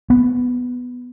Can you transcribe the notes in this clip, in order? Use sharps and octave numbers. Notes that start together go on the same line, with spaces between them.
B3